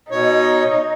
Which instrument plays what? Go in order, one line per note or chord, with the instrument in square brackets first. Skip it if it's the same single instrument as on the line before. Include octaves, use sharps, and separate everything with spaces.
[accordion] B2 C#5 [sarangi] D#4